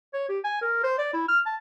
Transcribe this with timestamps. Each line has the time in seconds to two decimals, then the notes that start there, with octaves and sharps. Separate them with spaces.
0.14 C#5
0.29 G4
0.44 G#5
0.62 A#4
0.84 C5
0.99 D5
1.13 E4
1.28 F6
1.46 A5